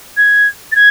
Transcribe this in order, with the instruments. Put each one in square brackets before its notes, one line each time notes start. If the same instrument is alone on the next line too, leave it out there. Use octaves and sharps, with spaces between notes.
[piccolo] G#6
A6
G#6